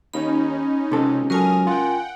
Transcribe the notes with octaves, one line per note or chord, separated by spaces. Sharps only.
D#2 C#4 D#4 B5
C#2 C3 A4
F#3 A4 A#4 G#5 D#6 F6
F4 F#5 G5